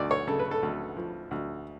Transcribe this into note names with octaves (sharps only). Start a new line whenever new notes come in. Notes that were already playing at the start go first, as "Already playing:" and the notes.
Already playing: D2 D5
C#5
C#3 A4
B4
A4
D2
F3
D2